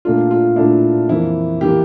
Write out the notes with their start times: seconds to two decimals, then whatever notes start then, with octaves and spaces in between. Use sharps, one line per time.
0.05 A#2 A3 D4 F4
0.31 F4
0.56 A#2 A3 D4 E4
1.09 F2 E3 A#3 E4
1.61 E3 A#3 G4